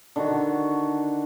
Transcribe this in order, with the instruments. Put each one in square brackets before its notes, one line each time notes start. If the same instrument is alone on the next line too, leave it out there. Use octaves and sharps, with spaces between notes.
[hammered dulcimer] D3 D#3 F#4